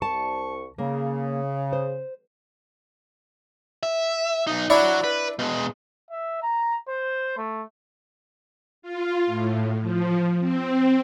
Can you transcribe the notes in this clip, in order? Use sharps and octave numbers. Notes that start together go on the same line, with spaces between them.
C2 A5 C#6
C#3 A#3
C5
E5
B1 D#4
D4 E4 F#4 C#5 B5
B4
B2 G#3
E5
A#5
C5
A3
F4
A2
F3
C4